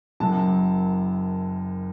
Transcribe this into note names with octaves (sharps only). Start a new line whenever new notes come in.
F#1 F#2 F#3 A5